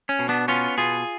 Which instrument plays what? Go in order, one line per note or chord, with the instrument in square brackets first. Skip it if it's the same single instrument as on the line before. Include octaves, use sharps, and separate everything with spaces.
[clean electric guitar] C#4
B2
B3 D4
B3 C#4 F4
B2 F4 G#4